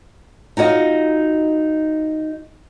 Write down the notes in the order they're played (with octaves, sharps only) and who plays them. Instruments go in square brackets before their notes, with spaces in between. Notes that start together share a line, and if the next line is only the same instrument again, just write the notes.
[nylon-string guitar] D#4 F4 F#4 D#5